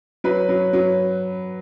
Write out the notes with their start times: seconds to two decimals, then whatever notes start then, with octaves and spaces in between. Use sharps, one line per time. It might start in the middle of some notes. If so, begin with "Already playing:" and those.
0.24 F#3 B4
0.49 F#3
0.73 F#3